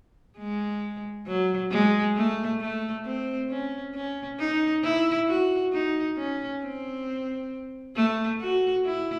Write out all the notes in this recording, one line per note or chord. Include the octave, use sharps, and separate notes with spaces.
G#3
F#3
G#3
A3
A3
C4
C#4
C#4
D#4
E4
F#4
D#4
C#4
C4
A3
F#4
E4